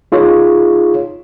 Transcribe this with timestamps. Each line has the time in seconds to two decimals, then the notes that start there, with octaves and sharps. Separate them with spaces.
0.12 D#4 F4 G#4 C#5